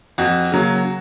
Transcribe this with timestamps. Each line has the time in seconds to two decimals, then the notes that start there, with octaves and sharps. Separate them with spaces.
0.18 F2 F#4
0.52 C#3 F#3 A#3